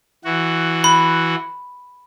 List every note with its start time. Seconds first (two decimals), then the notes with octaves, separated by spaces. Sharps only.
0.25 E3 F#4
0.84 B5